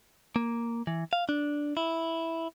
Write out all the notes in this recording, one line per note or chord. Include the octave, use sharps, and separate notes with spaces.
A#3
E3
F5
D4
E4